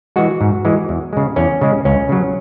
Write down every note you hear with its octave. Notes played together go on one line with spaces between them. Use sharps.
E3 G#3 F#4
G#2
E3 G#3
E2
C#3 G#3
E2 C#4
C#3 G#3
C#2 C#4
C#3 F#3